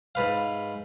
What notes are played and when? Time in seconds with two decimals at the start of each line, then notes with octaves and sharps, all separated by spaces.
0.15 G#2 B4 F5